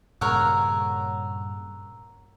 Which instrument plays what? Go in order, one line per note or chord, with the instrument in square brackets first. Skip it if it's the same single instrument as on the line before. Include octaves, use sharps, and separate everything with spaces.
[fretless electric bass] G2 A#2 C#3 [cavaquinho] A#4 C#5 F#5 [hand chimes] A#5 E6